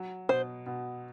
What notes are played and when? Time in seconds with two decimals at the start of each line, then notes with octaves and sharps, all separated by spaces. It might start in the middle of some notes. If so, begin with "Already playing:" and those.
Already playing: F#3
0.29 B2 C5
0.66 B2